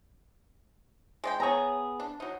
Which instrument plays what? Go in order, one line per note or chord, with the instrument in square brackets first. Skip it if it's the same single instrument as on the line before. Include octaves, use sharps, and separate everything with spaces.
[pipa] G#3 D5 G5
[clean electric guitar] B3 G#4 [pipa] C#5 A#5
[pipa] D4
F#3 D#4